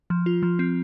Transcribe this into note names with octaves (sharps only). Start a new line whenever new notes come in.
F3
F4
F3
C4